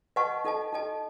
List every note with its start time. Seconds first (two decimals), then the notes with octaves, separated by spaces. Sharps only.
0.16 B4 D#5 F#5 A5 C#6
0.45 D#4 A4 D#5 A5
0.72 D#4 A4 D#5 A5